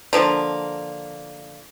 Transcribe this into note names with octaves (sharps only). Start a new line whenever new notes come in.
D3 F3 A#3